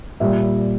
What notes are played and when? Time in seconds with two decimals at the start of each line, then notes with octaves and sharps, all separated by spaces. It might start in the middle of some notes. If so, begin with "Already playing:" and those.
0.20 A#2 G3 E5